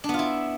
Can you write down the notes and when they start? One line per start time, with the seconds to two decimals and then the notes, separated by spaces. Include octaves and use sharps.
0.04 D4
0.09 B3
0.14 F4
0.19 E4